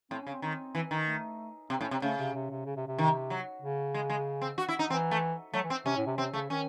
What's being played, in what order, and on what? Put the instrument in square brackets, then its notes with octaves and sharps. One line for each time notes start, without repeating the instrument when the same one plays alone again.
[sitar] A2 [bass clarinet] C4
[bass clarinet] C#4
[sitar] C#3
[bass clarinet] C4
[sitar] D#3 [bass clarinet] C4
[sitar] E3
D#3
[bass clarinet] A3
[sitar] C3 [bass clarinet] C4
[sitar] A2 [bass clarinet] C#4
[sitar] C3 [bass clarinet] C4
[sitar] C#3 [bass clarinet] A3
[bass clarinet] C3
C3
C3
C#3
C3
C3
[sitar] D#3
F#3
[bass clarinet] C#3
[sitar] G#3
G#3
C4
F#4
E4
D#4
[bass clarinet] E3 [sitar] C4
[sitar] A3
[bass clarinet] F#3 [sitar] A3
[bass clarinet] E3
[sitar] C4
[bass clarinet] C3 [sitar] C#4
[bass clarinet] A2
C3
[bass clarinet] C3 [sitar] C4
[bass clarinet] C#3 [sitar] A3
[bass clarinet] D#3 [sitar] C#4